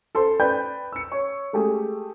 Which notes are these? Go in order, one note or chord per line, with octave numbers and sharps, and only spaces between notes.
A4 C5 C6
B4 D5 G5 B5 G6
E6 C#7
C#5 C#6
G#3 A3 G4 G#4